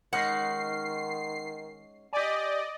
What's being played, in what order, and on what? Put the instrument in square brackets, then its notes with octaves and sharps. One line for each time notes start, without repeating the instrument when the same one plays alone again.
[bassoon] D#3 [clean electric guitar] G#3 C#4 D#4 [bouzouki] F#5 [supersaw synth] C7
[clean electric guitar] G4 G#5 [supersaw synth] D5 D#5